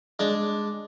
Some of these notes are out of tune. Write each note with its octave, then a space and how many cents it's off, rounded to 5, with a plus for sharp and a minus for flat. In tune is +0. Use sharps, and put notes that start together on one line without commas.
G#3 +0 D4 +0